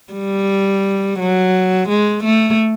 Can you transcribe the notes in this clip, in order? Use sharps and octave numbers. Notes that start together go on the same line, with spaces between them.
G3
F#3
G#3
A3